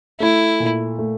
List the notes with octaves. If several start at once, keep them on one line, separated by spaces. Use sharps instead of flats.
A3 E4
A#2
A3